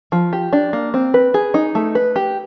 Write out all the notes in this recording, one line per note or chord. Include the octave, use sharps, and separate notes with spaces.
F3
G4
D4
A#3
C4
B4
G#4
D#4
A3
B4
G4